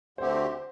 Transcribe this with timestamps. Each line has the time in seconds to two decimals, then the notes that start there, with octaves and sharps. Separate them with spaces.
0.18 D2 D3 A3 C4 G4 C5